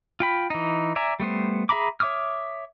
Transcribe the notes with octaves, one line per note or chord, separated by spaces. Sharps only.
F4 G5 B5
E3 D#4
D5 E5 G#5 A#5
G3 A3 B3 C5
G#4 E5 A#5 B5 D6
C#5 E5 D6 D#6 F6